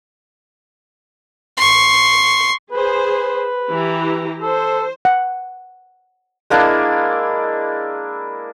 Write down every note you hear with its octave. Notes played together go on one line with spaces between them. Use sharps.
C6 C#6
G#4 B4 C5
E3 G4 A#5
A4 C5
F#5
G#3 A#3 D4 E4